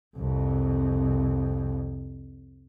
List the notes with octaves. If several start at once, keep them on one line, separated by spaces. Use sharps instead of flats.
C2 F2